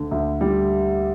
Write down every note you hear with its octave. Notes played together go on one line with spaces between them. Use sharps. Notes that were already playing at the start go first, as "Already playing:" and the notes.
Already playing: D2 D3
D2
G3